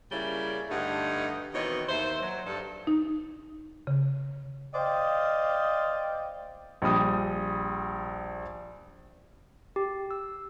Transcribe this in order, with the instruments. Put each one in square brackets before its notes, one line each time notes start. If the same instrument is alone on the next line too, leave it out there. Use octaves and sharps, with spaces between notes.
[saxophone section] C#3 G3 A#3 C#4 E4
G2 D3 A3 D#4 F#5
B2 D#3 E3 C4 C#5 D#5
D#2 C5 E5
F#3
G2 A4
[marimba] D#4
C#3
[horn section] C5 D5 D#5 F5 G5
[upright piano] A#1 G3 D#6
[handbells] G4
E6